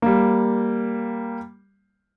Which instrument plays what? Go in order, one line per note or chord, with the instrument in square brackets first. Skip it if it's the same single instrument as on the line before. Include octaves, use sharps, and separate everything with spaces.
[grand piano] G3 A#3